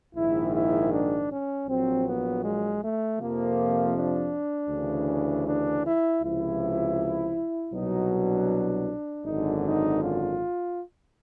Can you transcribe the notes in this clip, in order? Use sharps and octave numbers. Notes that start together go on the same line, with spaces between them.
A#1 G#2 D#3 E4
E4
D4
C#4
A#1 A#2 F#3 C4
B3
G#3
A3
F2 C3 F3 A#3
D4
D2 C#3 E3
D4
E4
C#2 C3 F3 E4
C2 B2 F#3 D#4
D4
G#1 F#2 D3 D#4
D#4
F4